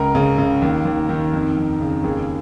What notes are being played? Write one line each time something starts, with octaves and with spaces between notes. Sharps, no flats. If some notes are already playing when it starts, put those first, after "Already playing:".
Already playing: C#2 A#4
C#3
C#3
D#2
D#2
D#3
F2
F2
C#3
D#2 G#4